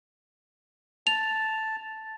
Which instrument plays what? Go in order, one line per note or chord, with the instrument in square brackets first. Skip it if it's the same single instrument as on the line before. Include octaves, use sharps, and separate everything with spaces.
[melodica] A5 [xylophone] F7